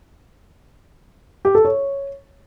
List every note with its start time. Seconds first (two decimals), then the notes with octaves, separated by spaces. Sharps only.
1.45 G4
1.55 A4
1.65 C#5